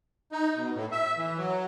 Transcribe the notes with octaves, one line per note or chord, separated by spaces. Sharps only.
D#4
B2
A2
E5
E3
F#3